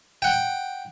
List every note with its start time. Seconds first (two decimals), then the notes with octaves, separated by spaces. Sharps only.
0.22 F#5 G5